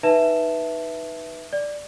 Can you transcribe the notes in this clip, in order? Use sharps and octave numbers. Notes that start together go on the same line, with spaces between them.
D#4 B4 E5 A5 E7
D5